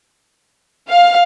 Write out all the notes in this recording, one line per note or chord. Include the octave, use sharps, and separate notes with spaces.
F5